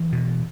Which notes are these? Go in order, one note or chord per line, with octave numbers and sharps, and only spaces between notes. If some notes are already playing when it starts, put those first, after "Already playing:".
Already playing: E3
B2